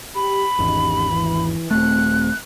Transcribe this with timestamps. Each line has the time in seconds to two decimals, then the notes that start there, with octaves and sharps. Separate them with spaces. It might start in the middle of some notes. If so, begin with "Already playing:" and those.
0.15 G4 B5
0.59 G#1 E2 C#4 D#4 G4
1.11 E3
1.71 D#1 A3 C4 F#6